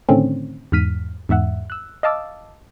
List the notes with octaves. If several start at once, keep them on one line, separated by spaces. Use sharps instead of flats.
A2 D3 D#3 A3 C4 C#4
E2 G#2 F6 B6 D#7
E2 G#2 E5 F#5
E6 F#6
D#5 F5 A5 D6 E6